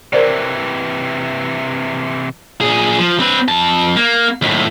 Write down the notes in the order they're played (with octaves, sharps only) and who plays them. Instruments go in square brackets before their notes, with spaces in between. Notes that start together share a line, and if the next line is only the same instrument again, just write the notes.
[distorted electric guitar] C3 E3 [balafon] A#4 C5 D5
[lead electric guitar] A#2 G#4
F3
C4 B4
F2 A5
A#3
D#2 A2